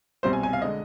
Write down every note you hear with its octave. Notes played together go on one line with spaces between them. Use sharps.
C2 B2 G3 C4 C5
G#5
G#5
F5
D3 G#3 D#5